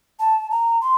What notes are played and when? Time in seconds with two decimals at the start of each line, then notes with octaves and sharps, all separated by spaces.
0.19 A5
0.51 A#5
0.81 C6